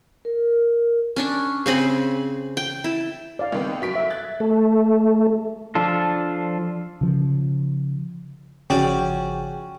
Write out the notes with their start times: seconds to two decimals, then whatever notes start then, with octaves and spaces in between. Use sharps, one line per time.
0.25 A#4
1.16 C#4 D4 C#6
1.66 C#3 C4 G#4 B5
2.57 G5
2.84 E4 A5
3.39 D5 F5
3.52 C2 D#3 B3
3.82 F#2 B6 D7
3.96 E5
4.10 F#6 G#6 A6
4.40 A3
5.75 F3 D4 F4 A4
7.01 C#3 F3
8.70 G#1 C#3 F3 C#4 F#4 G#4 D5 G5